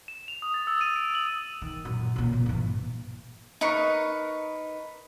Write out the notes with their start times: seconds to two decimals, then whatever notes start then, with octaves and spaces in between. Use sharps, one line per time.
0.08 E7
0.28 F7
0.42 D#6
0.54 A6
0.67 E6
0.81 D#7
0.96 D7
1.15 F#7
1.62 D#3
1.85 F#2 A#2
2.16 A#2 C#3
2.33 A#2
2.46 G2 E3
3.61 D#4 A#4 B4 C#6